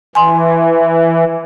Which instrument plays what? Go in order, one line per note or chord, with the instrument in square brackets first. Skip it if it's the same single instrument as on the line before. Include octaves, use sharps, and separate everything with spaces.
[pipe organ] E3 [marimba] G#5 C6